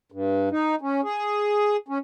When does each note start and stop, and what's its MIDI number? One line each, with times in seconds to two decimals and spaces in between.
0.12 0.49 43
0.51 0.75 63
0.81 1.01 61
1.04 1.77 68
1.88 1.98 61